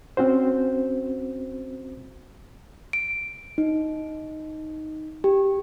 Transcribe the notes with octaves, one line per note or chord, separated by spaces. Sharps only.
C4 C#4 F#4 C5
D7
D#4
G4